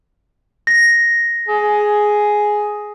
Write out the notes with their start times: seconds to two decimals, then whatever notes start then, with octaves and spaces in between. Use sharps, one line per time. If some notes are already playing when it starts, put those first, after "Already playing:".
0.67 A#6
1.48 G#4